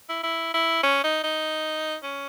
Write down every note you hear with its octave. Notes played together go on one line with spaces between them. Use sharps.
E4
E4
E4
C#4
D#4
D#4
C#4